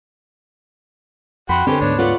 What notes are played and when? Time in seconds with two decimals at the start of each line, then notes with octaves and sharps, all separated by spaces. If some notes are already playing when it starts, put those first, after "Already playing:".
1.49 F2 F#4 F#5 G5 B5 C6
1.67 D3 C4 C#4 G4 B4 C5
1.81 D2 G#2 B3 D4 C#5
1.99 F4 B4 C#5 D5 F#5